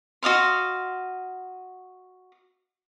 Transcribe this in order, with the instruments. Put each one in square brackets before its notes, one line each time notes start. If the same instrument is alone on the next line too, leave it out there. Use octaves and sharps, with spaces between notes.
[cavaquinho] F#4 D#5 F5 C6